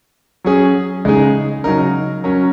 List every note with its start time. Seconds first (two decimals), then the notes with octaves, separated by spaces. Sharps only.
0.44 F#3 C#4 G#4
1.05 C#3 G#3 D#4 G#4
1.64 C#3 F#3 D#4 A#4
2.24 F#3 C#4 A#4